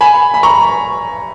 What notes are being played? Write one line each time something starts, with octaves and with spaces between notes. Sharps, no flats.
G#5 B5
B5
A#5 C#6